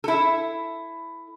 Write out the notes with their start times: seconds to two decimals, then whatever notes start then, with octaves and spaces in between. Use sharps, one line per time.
0.04 E4 A4